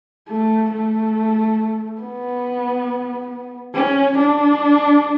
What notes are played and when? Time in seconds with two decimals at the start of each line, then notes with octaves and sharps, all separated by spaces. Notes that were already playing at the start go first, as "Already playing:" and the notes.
0.28 A3
0.72 A3
2.02 B3
3.75 C#4
4.18 D4